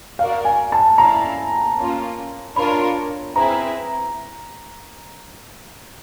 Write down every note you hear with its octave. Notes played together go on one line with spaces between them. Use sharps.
F#4 A#4 D5 F5
G#5
A5
C#4 E4 A4 D5 F5 A#5
A#3 C#4 F4
D4 F4 A#4 C#5 B5
C4 E4 G#4 B4 A#5